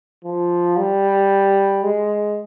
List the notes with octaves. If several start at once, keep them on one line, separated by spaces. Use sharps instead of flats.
F3
G3
G#3